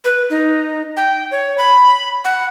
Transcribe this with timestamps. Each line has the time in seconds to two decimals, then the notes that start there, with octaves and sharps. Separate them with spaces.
0.05 B4
0.30 D#4
0.97 G5
1.31 C#5
1.58 B5
2.25 F#5